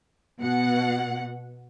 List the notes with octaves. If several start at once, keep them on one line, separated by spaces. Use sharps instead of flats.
B2 F#5